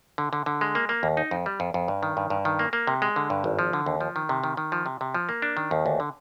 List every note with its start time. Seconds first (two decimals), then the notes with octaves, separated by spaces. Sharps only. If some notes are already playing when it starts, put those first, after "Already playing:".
0.18 D3
0.33 D3
0.46 D3
0.61 G#3
0.75 A#3
0.89 A#3
1.03 D#2
1.17 D#4
1.31 F2
1.46 G3
1.60 F2
1.74 F2
1.88 G2
2.03 D#3
2.17 G2
2.30 G2
2.45 D#3
2.59 A#3
2.73 A#3
2.87 C3
3.02 G#3
3.16 D3
3.30 G2
3.44 G#1
3.59 F3
3.73 D3
3.86 D#2
4.01 F3
4.16 D#3
4.29 C3
4.44 D#3
4.57 D#3
4.72 F3
4.86 C3
5.01 C3
5.14 F3
5.29 A#3
5.42 D4
5.57 D#3
5.71 D#2
5.86 D2
6.00 D3